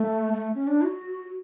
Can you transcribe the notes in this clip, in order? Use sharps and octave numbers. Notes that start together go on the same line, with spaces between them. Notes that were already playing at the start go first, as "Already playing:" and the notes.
Already playing: A3
A3
C#4
D4
F#4